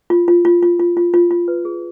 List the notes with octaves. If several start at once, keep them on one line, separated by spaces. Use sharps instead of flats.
F4
F4
F4
F4
F4
F4
F4
F4
B4
G#4